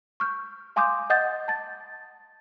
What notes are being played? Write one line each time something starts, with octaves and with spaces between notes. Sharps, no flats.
C#6 F6 G6
F5 G#5 C6 D6 D#6 G6
D#5 F#5 D#6 G6 A6
A5 A6